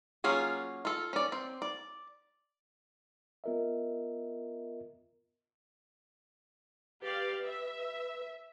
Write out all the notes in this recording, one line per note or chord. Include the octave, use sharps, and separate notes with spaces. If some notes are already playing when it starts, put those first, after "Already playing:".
F#3 A#3 C#4 F4 G#4
F4 A4
C#4 D5
C4
D5
B3 F4 A#4 D#5 E5
G4 B4 D5 F5
E5